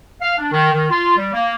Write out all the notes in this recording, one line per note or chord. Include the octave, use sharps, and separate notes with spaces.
F5
D4
D#3
D#3
F4
G3
A#3